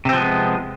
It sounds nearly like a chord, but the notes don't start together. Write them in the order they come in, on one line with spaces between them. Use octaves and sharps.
C3 C4 F3 B3 G#3